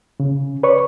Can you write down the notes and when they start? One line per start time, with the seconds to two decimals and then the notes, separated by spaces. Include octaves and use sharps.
0.20 C#3
0.63 B4 C#5 D5 C#6